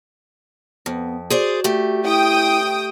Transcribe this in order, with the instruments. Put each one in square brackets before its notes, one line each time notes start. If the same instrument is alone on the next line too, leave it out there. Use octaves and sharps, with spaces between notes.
[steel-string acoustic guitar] F2 [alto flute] B3
[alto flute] F#4 [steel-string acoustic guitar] G#4 C5 D5
[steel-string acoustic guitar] A3 G4
[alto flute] E4 [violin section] G5 D#6